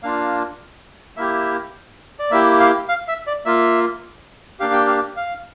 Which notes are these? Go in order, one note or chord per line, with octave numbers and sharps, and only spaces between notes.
A#3 D4 F4 F5
A#3 E4 G4 E5
D5
A#3 E4 G4 E5
F5
F5
E5
D5
A#3 F4 E5
A#3 D4 G4 F5
G5
F5
F5